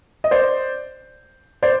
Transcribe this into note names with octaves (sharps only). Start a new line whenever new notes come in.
D#5
C5 D5
C5 D5